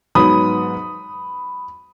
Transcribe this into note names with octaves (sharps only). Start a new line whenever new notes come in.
G#2 F#3 B3 B5 D#6